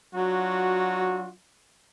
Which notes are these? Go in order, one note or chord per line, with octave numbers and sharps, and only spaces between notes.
F#3 D4 F4 F#4